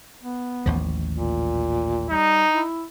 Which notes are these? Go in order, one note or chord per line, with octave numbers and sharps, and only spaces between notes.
B3
A1 D#2 F3
A#2
G3 D#4
E4